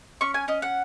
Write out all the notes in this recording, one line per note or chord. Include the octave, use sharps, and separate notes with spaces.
C#4 C#6
G#5
C#4 D#5
F#5